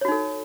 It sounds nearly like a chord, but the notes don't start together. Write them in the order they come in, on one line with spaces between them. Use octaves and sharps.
C#5 F#4 D#4 A4